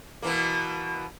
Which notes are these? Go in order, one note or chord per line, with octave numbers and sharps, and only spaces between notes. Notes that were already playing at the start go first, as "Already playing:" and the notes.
B2 E3 A#3